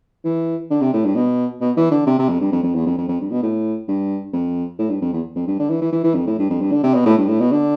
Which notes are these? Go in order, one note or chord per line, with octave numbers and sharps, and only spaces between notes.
E3
D3
C3
A2
G2
B2
B2
E3
D3
C3
C3
F2
G2
F2
F2
E2
F2
F2
F2
G2
B2
A2
G2
F2
A2
G2
F2
E2
F2
G2
D3
E3
E3
E3
E3
F2
A2
G2
F2
G2
D3
C3
B2
A2
G2
A2
B2
D3